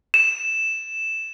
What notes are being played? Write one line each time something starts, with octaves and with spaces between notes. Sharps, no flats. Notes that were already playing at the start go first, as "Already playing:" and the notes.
E7